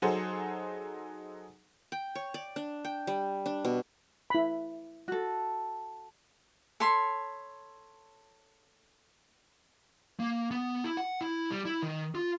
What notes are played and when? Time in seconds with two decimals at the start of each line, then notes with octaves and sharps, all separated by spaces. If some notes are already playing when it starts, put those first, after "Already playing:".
0.02 F#3 D#4 G#4 A4 C5 F#5
1.92 G5
2.15 C#5
2.34 D5
2.56 D4
2.85 G5
3.07 G3
3.46 D4
3.65 B2
4.30 E4 B5
5.08 F#4 A4
6.80 A4 C#5 B5 C6
10.20 A#3
10.51 B3
10.84 E4
10.97 F#5
11.21 E4
11.51 G3
11.65 E4
11.82 D#3
12.15 F4